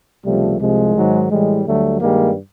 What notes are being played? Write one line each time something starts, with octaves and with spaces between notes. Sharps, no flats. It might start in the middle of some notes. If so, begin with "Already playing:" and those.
C#2 C3 F3 G3 A3
C2 C3 F3 G#3
G#2 D#3 F#3
A2 E3 G3 G#3
D2 D3 F#3 G3 A3
G2 D#3 G3 G#3 A#3